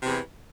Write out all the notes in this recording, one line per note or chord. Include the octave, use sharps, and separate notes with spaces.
E2 C3 E3